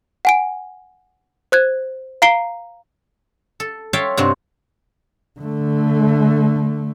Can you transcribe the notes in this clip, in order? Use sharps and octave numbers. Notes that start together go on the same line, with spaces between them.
F#5 G#5 D7
C5 F#6 G#6
F5 A#5 C7 D7 G7
A4
C#5 E5 F5 G5 A5 C6
G2 C3 C4 F#4
D3 A3